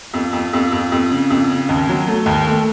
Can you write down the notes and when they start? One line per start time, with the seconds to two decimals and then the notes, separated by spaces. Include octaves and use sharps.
0.14 F2
0.33 F2
0.53 F2
0.72 F2
0.92 F2
1.11 C#3
1.30 F2
1.50 C#3
1.69 D#2
1.89 F#3
2.07 A3
2.26 D#2
2.47 A3